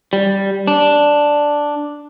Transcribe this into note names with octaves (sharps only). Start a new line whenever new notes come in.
G3
D4